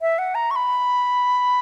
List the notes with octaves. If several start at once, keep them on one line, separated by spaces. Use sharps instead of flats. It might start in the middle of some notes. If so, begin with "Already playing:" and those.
E5
F#5
A#5
C#6
B5